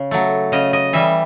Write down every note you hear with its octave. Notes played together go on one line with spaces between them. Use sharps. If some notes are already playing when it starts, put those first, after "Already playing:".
Already playing: C#3
F#3 A3
C#3 D#5
D#5
E3 G3 E5